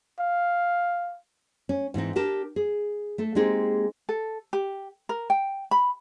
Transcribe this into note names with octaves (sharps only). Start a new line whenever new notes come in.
F5
C#4
G#2 E3 C4 D#4
D4 G4 A#4 A5
G#4
A3 A4
G#3 A#3 C4 D#4 G4 G#4
A4
G4
A#4
G5
B5